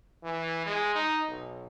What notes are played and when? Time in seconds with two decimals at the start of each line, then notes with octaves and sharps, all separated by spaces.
0.23 E3
0.66 G#3
0.96 D#4
1.28 B1